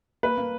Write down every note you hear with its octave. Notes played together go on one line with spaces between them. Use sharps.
A#3 B4
A#3